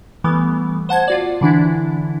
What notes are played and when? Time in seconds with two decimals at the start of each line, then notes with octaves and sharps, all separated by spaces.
0.24 E3 G3 A3 B3
0.89 C5 F#5 A5 G#6
1.08 F4 F#4 D5
1.41 D3 E3 D4 E4